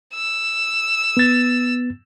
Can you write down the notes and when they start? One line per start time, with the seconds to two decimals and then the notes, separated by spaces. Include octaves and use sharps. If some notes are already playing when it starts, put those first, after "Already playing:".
0.14 E6
1.17 B3 A6